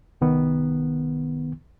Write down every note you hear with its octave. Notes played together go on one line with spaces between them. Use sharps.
C2 D#3 B3